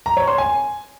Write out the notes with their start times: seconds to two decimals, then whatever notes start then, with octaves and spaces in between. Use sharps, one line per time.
0.06 A#5
0.17 C#5
0.27 C6
0.38 G#5